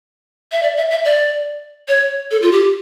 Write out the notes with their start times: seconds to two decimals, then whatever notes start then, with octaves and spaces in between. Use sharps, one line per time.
0.52 E5
0.63 D5
0.77 E5
0.91 E5
1.05 D5
1.88 C#5
2.31 A4
2.42 F4
2.52 G4